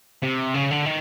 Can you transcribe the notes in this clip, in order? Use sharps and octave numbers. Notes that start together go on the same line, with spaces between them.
C3
C#3
D3
D#3